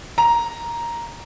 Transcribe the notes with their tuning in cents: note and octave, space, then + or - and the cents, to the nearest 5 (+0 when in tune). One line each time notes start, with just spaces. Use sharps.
A#5 +5